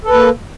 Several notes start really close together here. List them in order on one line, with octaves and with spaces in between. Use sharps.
A4 B4 A#3